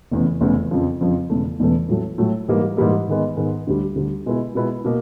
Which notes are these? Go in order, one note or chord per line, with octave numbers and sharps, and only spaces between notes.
F1 E2 C#3 E3
F1 E2 C#3 E3
F2 C#3 F3
F2 C#3 F3
E1 E2 C#3 E3 A3
E1 E2 C#3 E3 A3
A2 F#3 A3
A2 F#3 A3
G#2 E3 G3 A#3
G#2 E3 G3 A#3
G#2 D#3 G#3 B3
G#2 D#3 G#3 B3
D2 D3 G3
D2 D3 G3
B2 G#3 B3 E4
B2 G#3 B3 E4
B2 A#3